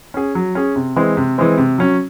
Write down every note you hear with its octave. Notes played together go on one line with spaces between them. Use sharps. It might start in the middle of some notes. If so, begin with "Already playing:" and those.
C#4 G#4
F#3
C#4 G#4
C3
E3 G#3 C4
C3
E3 G#3 C4
C3
F#3 C#4